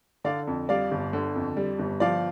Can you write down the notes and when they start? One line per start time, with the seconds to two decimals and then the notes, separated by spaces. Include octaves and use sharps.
0.24 D3 D5 F5
0.47 F2
0.69 G3 D5 F5
0.91 G1
1.13 D3
1.35 F2
1.57 G3
1.79 G1
2.00 F3 D5 F5